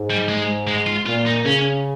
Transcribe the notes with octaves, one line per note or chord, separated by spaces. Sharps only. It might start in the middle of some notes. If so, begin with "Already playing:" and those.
Already playing: G#2
G3
G#3
G#3
F4
A#2 F4
D#4
C#3 C#4